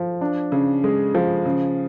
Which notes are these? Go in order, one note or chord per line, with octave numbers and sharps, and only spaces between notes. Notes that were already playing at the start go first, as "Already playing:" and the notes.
Already playing: F3
D4
C#3
G#3
F3
C#3